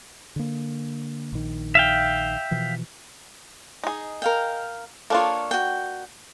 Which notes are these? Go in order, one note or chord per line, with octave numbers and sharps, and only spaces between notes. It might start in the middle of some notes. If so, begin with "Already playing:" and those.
D3 A#3
A#1 D#3
E5 F5 G5
B2 E3 F3
D#4 G#4
A#4 F5 G5
A#3 D4 F4 A4 C#5
F#4 G5